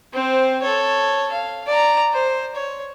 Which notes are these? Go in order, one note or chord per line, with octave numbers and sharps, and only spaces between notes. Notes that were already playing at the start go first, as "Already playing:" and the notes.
C4 C5
A4 C#5
F5
D5 A#5
C5
C#5